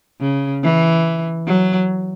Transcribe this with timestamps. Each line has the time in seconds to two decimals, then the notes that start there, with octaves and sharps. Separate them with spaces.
0.21 C#3
0.63 E3
1.47 F#3